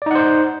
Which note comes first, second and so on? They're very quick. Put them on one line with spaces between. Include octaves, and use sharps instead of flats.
D5 D#4 F#5 C5